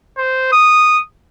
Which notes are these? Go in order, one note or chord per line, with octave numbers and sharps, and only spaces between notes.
C5
D#6